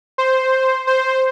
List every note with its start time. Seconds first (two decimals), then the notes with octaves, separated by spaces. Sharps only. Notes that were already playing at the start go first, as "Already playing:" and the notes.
0.18 C5
0.87 C5